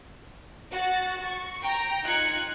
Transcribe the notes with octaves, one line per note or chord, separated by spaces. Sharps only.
F#4 F#5 A6
C#6
G5 A#5 D7
D#4 F4 F#6 G#6 C#7